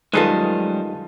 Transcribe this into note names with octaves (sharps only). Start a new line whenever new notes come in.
F#2 D#3 G3 G#3 F4 G#4 A4 B4